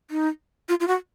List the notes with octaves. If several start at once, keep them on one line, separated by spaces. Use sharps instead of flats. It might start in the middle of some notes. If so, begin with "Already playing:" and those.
D#4
F4
F4
F#4